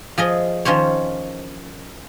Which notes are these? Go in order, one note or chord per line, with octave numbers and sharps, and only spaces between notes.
F3 G#4 D#5
D#3 F3 C#4 C5 C#5